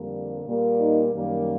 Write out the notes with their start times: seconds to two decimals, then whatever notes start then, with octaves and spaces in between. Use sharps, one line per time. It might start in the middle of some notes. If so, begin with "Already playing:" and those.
Already playing: F2 D3 G3 A#3
0.45 A#2 G3 A#3
0.79 D#4
1.12 F#2 D#3 G3 A#3